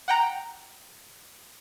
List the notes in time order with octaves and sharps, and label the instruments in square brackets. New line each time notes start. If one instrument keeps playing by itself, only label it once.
[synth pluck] F#5 G5 A#5